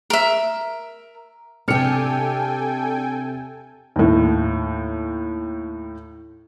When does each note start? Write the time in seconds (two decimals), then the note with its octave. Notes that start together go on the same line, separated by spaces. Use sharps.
0.10 A#4 E5
1.68 C3 D4 G4 A4 G5 G#5 F6 C#7
3.96 D#2 A2